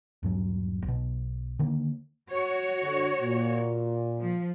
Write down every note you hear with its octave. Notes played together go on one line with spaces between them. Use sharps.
D#1 G2 F#3
B1 B2
D3 D#3 A#3
F#4 C#5
D3
A#2
F3